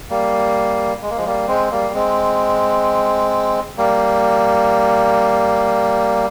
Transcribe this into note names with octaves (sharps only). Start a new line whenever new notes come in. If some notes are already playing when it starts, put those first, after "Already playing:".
G3 A#3
G#3
A#3
F3 G#3
G3 A#3
G#3 C4
G3 A#3
G#3 C4
G3 A#3